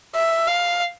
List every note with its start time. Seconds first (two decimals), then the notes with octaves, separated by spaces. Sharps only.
0.15 E5
0.47 F5